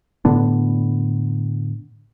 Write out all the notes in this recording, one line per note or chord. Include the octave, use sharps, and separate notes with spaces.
A2 D3 B3 D4